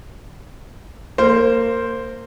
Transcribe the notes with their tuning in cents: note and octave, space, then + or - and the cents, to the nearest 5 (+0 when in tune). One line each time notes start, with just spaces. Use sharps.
A#3 -20 C5 +0